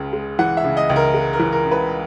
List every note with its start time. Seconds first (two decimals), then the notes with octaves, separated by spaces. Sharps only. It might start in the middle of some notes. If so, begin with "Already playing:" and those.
Already playing: C#2 C#3
0.13 G#3
0.39 E3 F#5
0.57 E5
0.64 C#3
0.77 D#5
0.90 C#2
0.96 A#4
1.14 G#3
1.33 A#4
1.39 E3
1.53 A#4
1.64 C#3
1.71 B4